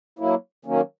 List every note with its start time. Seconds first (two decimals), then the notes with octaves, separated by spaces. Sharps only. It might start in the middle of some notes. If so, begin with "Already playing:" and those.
0.19 F#3 A#3 E4
0.65 D#3 F#3 A#3 C#4